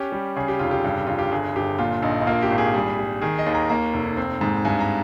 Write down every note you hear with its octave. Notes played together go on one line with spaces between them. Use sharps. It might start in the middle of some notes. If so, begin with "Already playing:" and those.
Already playing: C#4 G4
G3
C#3 G#4
G4
F1 F4
G4
G2
G2 F4
G4
G1 G#4
G1 G4
A#2 F4
A#1 D#4
D#4
A#3 F4
G4
G#1
G#4
G3 G#4
G3
D#3 G#4
D#5
D#2
A#5
A#3 A#5
F1
C4
G#2
G2 G#5
A#5